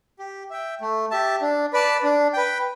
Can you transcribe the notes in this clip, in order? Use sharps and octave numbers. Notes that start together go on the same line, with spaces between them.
G4
E5 G5
A3
G4 E5 A5
D4
B4 D5 A5
D4
B4 G5